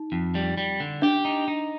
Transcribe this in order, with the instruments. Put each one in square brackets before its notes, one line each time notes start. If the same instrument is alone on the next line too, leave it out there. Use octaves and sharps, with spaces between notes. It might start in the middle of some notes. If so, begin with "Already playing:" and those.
Already playing: [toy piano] D#4
[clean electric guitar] F2
G3
G3
D3
[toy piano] D4 [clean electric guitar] G4
[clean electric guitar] D#4
D#4